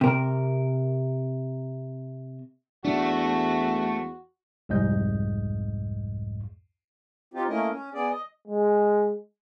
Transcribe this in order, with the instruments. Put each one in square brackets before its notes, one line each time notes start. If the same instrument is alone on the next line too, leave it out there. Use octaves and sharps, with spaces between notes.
[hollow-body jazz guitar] C3 A#4
[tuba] E2 [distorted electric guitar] A3 [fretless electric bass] D4 [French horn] F#4
[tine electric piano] C2 F2 G#2 D#5 G6
[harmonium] C4 D#4 F4 G4
A3 A#3 C#4 E4 A#4 D#5
C#4
B3 G#4 D5
D#5
[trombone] G#3